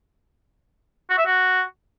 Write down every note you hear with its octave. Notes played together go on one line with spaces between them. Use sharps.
F#4
E5
F#4